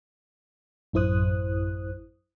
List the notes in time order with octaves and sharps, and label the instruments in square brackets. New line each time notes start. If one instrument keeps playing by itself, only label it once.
[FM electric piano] A1 F#2 E4 C5 D#6 F#6